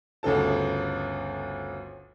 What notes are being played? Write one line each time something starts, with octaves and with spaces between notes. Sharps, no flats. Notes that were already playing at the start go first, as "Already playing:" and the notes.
G1 D2 C#3 A4 A5